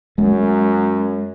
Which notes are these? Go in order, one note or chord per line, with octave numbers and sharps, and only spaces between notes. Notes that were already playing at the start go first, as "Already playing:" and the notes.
F#2 G#3